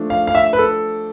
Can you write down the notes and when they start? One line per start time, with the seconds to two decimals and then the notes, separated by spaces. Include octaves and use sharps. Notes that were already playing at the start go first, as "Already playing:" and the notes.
Already playing: F3 A3 D4
0.10 F5
0.27 F5
0.35 E5
0.53 B4
0.59 A4